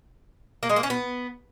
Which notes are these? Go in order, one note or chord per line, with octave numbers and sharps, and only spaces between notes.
A#3
G#3
A#3
C#4
B3